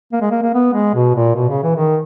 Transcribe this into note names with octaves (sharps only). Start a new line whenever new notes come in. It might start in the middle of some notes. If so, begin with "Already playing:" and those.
A#3
G#3
A#3
A#3
B3
G#3
B2
A#2
B2
C#3
E3
D#3